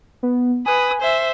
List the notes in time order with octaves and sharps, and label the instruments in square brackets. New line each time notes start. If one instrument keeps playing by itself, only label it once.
[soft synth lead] B3
[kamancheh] B4 D#6 [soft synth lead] G#5
[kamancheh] C5 E5